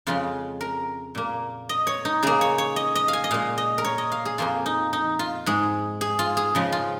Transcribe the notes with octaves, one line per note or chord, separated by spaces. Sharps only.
F2 C#3 G#3 F4
A#4
A#2 A#3
D#5
C#5
D#4
C#3 A#3 G#4
C#5
C#5
D#5
D#5
F5
G#5
D#5
A#2 G#3 F5
D#5
A#4
C#5
D#5
F5
G#4
F2 F3 A#3 F4
D#4
D#4
F4
G#2 G#3 G#4
G#4
F4
G#4
C#3 F3 G#3
F4